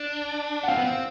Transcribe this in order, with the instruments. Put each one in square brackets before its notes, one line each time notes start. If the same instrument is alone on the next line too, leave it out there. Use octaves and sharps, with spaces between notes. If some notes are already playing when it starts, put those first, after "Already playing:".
Already playing: [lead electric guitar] D4
[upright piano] F#5
[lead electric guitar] C4 [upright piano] F5 G5
[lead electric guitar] B3
C4